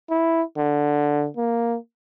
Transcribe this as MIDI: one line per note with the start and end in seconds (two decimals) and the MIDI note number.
0.10 0.42 64
0.57 1.27 50
1.37 1.77 58